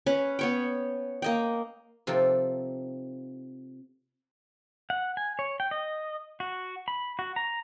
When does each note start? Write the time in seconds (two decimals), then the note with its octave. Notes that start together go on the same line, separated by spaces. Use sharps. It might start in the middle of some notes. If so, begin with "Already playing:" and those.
0.06 C#4 B4
0.39 B3 C#5 G5
1.22 A#3 D#5 G5
2.07 C3 F3 A#3 D#4 A4 G5
4.90 F#5
5.17 G#5
5.39 C#5
5.60 G5
5.71 D#5
6.40 F#4
6.88 B5
7.19 F#4
7.36 A#5